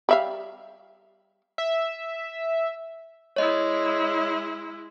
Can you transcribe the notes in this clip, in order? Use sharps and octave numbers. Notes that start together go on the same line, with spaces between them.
G3 E5 F5
E5
G#3 E4 C#5 D#5